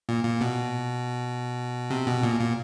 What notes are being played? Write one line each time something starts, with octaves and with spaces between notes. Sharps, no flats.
A#2
A#2
B2
C3
B2
A#2
A#2